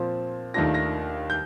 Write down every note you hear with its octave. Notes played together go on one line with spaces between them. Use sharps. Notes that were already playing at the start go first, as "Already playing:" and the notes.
Already playing: A#2 F3 C4
D#2 D#3 A3 D4 F4 A#6
A#6
G6